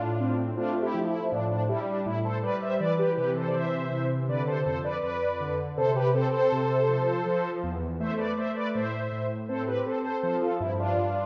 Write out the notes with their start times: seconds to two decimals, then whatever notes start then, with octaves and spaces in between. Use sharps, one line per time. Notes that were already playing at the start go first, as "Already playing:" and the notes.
Already playing: A2 D4 F4
0.20 C4
0.57 A3 D4 F4
0.82 E4 G4
0.94 F3
1.07 E4
1.32 A2 D4
1.51 D4
1.69 G3 E4
1.88 D4
2.06 A2 E4
2.25 A4 C5
2.43 G3 B4 D5
2.62 C5 E5
2.80 E3 B4 D5
2.99 G4 B4
3.17 C3 G4 B4
3.36 A4 C5
3.48 D5
3.54 E3 C5 E5
3.91 C3
4.28 D3 B4 D5
4.47 A4 C5
4.66 F2 A4 C5
4.84 B4 D5
5.03 F2 B4 D5
5.40 D3
5.77 C3 A4 C5
5.96 G4 B4
6.14 C4 A4 C5
6.33 A4 C5
6.52 C3
6.89 F3
7.26 F3
7.63 E2
8.00 A3 C5 E5
8.18 B4 D5
8.37 A3 C5 E5
8.56 B4 D5
8.74 A2 C5 E5
9.12 A2
9.49 C4 A4 C5
9.67 G4 B4
9.86 C4 A4 C5
10.05 A4 C5
10.23 F3 A4 C5
10.42 F4 A4
10.60 G2 E4
10.79 D4 F4
10.97 G2